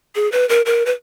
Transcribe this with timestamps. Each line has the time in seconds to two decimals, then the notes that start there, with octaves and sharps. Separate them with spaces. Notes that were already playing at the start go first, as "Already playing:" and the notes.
0.15 G#4
0.32 B4
0.49 A#4
0.66 A#4
0.86 B4